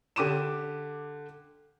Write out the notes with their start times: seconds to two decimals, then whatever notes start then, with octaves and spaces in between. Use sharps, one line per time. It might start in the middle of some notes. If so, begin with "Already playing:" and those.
0.16 D3 G4 D6 D#7 E7